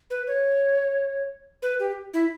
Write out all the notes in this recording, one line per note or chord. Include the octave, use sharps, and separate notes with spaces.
B4
C#5
B4
G4
E4